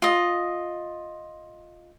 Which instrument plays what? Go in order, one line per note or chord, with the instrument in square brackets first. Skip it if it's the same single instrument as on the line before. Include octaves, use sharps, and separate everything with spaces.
[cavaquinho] F4 D#5